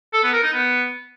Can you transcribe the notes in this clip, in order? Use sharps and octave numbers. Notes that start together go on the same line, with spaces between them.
A4
B3
A#4
D#4
B3